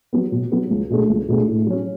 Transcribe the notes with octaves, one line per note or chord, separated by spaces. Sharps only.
F#3 B3
B2
F#3 B3
C#2
B2 A3 D4 G#4
C#2
B2 A3 D4 G#4
A2
F#3 C#4